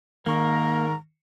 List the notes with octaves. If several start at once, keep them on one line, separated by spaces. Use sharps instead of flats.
G#2 D#3 A#3 D#4 A#4 A#5 C#6